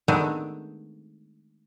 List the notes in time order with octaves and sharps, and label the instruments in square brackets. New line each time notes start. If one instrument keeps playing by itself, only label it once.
[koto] D#3 G#3 A3 B3 C4 D4